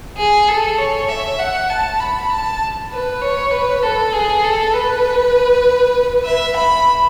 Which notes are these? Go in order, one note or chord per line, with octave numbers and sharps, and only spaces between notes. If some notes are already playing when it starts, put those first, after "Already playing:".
G#4
A4
C#5
E5
F#5
A5
B5
A5
B4
C#5
B4
A4
G#4
A4
B4
E5
B5